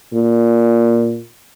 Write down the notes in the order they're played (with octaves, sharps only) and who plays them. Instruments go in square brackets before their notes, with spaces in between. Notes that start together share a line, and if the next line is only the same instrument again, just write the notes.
[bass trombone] A#2